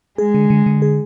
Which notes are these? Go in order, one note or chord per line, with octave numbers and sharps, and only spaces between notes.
G#3 G#4
D3
D3
D3
G#4